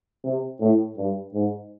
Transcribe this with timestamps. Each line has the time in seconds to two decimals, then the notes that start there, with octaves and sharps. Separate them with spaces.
0.24 C3
0.60 A2
0.97 G2
1.34 G#2